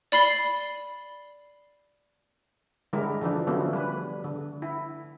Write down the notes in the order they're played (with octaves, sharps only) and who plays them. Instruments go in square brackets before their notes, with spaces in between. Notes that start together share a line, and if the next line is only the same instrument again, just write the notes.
[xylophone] D5 B5 C7 G7
[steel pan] D3 G3 G#3 E4 A#4
D3 E3 F3 D4
D3 F3 F#3 A3 B3 C#4
G3 B4
D3
E4